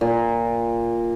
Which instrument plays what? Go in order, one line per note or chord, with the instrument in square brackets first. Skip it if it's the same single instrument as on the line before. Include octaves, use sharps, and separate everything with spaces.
[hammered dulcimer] A#2